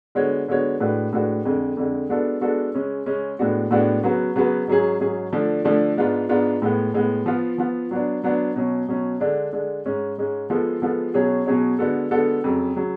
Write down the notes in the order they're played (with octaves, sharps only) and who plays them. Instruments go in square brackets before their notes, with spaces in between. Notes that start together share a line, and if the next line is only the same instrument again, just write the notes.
[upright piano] D3 G#3 B3 F#4 C#5
D3 G#3 B3 F#4 C#5
A2 G#3 D4 F#4 B4
A2 G#3 D4 F#4 B4
F2 D3 G#3
F2 D3 G#3
G#3 B3 D4 F#4 A4
G#3 B3 D4 F#4 A4
C#3 G#3 C#4
C#3 G#3 C#4
A2 G#3 B3 D4 F#4
A2 G#3 B3 D4 F#4
C#3 F#3 B3 F#4 B4
C#3 F#3 B3 F#4 B4
G#2 F#3 C#4 G#4
G#2 F#3 C#4 G#4
D3 F3 A3 D4
D3 F3 A3 D4
G#2 G#3 B3 D4 F4
G#2 G#3 B3 D4 F4
A2 G#3 B3
A2 G#3 B3
F3 B3 F4
F3 B3 F4
F#3 B3 D4
F#3 B3 D4
B2 F#3 C#4
B2 F#3 C#4
D3 G#3 D4
D3 G#3 D4
G#2 G#3 C#4
G#2 G#3 C#4
F3 G#3 B3 F4 A4
F3 G#3 B3 F4 A4
B2 F#3 C#4 G#4 C#5
B2 F#3 C#4 G#4 C#5
D3 G#3 B3 F#4 A4
D3 G#3 B3 F#4 A4
F2 C#3 F#3
C#3 F#3